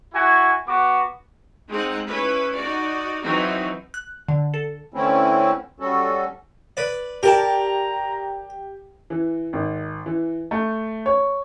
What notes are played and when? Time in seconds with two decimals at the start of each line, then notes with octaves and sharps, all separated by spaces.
0.14 E4 F#4 G#5
0.68 B3 F#4 D6
1.69 G#3 C4 D#4 F#5
2.08 C#4 E4 B4
2.54 D#4 F#4 D5
3.23 E3 F#3 C4 D#4 F#4
3.94 F#6
4.29 D3
4.54 A4
4.94 D3 E3 A3 C4 C#4 E4
5.80 G3 C#4 F#4 A4
6.77 B4 D5
7.23 G4 A#4 D5 A5 A#5
9.10 E3
9.53 G#1
10.06 E3
10.51 A3
11.06 C#5